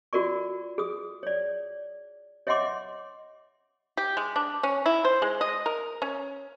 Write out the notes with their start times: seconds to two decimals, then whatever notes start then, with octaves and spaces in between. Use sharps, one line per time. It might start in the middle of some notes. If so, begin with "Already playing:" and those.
0.13 F4 F#4 A#4 D5 C#6
0.78 G#4 D#6
1.23 C#5 D5
2.47 C#5 D#5 E5 F#5 C6 D6
3.97 G4
4.17 G#3
4.36 D4
4.63 C#4
4.86 E4
5.05 C5
5.22 G#3
5.41 D#5
5.66 A#4
6.02 C#4